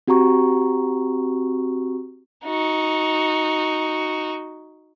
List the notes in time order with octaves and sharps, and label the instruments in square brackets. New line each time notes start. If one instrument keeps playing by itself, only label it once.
[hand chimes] C4 F#4 G4 A#5 C#6
[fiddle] D#4 F#4